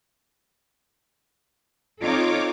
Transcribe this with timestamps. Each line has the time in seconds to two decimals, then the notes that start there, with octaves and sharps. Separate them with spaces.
1.99 C4 D#4 F4 A4 C#5 D6